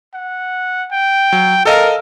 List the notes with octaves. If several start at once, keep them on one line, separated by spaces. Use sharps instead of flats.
F#5
G5
F#3
A4 A#4 D#5 F5